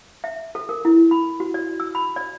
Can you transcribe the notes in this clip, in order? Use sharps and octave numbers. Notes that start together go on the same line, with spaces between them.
E5
A4
A#4
E4
B5
F#4
D5
E6
B5
D5